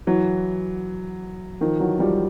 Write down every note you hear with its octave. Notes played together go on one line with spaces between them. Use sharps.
E3 F#3
D#3 F3
E3 F#3
F3 G3